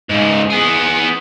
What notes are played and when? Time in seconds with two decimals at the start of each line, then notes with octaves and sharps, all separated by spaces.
0.09 G#2 C#3
0.50 B3 G#4